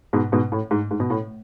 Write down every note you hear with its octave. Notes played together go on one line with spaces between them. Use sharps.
G#2 B2
G#2 B2
A2
G#2
G#2
B2
A2